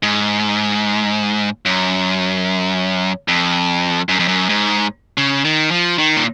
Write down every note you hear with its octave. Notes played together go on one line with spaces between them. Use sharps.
G#2
F#2
F2
F#2
F2
F#2
G#2
C#3
D#3
F3
D#3
A#2